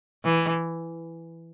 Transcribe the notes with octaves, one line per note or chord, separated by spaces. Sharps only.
E3